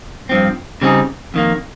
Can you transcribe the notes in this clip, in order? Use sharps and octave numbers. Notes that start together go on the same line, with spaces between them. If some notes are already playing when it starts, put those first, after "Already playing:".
G2 F3 C4
C#3 G3 C4 D#4 G#4
F2 D#3 A#3